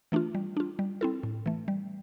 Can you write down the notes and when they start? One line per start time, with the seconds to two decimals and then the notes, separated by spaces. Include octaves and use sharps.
0.12 E3 A3 D4 F4
0.35 G3
0.57 D4 F4
0.79 G3
1.01 C4 E4 A4
1.23 A2
1.46 E3 A3
1.68 G3